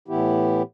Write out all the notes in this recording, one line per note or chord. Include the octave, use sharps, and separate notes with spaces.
A2 E3 B3 E4 G4